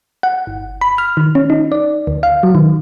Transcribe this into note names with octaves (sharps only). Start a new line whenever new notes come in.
F#5
G1
B5
F6
D#3
C#4
D#4
D5
D2
F5
F#3
D#3